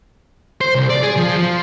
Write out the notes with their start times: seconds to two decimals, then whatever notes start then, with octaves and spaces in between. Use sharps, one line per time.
0.61 C5
0.75 C2
0.90 D5
1.03 G#4
1.17 F3
1.37 F3